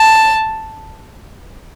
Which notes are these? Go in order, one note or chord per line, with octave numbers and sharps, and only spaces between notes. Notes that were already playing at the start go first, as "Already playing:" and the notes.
Already playing: A5